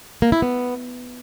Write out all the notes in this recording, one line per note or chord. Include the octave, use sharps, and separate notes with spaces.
A#3
E4
B3